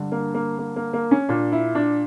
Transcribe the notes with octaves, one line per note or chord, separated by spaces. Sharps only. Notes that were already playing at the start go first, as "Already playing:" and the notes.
Already playing: G2 D3
A#3
A#3
A#3
A#3
A#3
C#4
A#2 D4
E4
D4